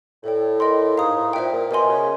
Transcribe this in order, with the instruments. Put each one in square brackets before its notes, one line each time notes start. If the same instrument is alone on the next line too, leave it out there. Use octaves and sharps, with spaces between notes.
[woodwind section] A2 [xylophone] A4 D5 G5
[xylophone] A#4 D#5 G5 C6
[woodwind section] G#2 [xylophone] F5 A#5 D#6
[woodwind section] A2
[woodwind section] A#2 [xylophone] C5 E5 G5
[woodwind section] A#2
[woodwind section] B2 [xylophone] A#4 D#5 G#5 C6
[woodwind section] C#3